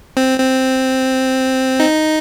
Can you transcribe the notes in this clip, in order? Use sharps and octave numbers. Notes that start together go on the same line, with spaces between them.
C4
C4
D#4